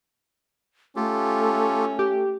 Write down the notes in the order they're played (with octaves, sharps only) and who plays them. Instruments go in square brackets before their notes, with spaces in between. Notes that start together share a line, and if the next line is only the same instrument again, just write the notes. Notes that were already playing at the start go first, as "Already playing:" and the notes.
[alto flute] A3 [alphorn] C#4 [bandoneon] F4 G4 A4
[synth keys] G4